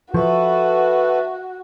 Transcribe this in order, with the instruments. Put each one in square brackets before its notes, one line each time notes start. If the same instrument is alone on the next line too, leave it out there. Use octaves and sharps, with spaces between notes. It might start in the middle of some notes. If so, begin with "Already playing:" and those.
[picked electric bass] F3 [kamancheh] F#4 [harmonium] A4 B4 [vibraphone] E5 C#6